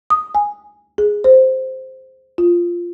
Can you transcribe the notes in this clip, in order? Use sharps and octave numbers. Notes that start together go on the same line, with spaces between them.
D#6
G#5
G#4
C5
F4